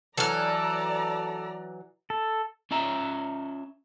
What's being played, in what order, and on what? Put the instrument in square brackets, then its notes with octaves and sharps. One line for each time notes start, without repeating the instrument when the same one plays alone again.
[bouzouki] E3 F#3 [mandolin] A4 F6 [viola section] D5 A#5
[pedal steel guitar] A4
[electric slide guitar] C#4 F4 E5 A#5